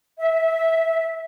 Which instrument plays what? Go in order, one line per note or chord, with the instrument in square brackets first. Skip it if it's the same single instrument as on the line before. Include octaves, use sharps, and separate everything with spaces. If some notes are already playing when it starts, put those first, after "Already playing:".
[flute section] E5